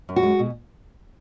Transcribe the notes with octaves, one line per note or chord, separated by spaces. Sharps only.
F#2
F#4
G#3
B2